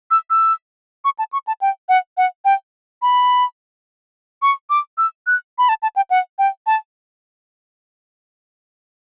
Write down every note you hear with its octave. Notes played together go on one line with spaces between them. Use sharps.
E6
E6
C#6
A5
C#6
A5
G5
F#5
F#5
G5
B5
C#6
D6
E6
F#6
B5
A5
A5
G5
F#5
G5
A5